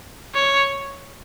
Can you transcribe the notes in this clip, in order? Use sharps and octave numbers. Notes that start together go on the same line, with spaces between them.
C#5